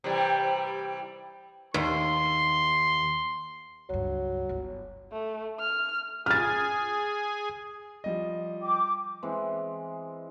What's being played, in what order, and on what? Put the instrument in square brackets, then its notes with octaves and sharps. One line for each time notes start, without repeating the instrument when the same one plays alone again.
[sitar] C3 E3 G3
[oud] D#2 [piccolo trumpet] C6
[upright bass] C#2 G2 [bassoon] F#3
[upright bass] G1
[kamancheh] A3
F6
[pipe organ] G#4 G#5 [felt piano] F6 A6
[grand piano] F3 G3 D#5
[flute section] G5 D6
[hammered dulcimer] E3 G#3 C4